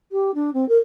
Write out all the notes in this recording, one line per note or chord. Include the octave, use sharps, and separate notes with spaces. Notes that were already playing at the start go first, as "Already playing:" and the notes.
G4
D4
C4
A#4